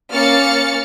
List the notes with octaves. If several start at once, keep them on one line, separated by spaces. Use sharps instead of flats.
A#3 C#4 F5 F6 A6 C#7